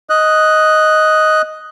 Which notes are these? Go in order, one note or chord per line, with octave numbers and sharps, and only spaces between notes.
D#5 F#6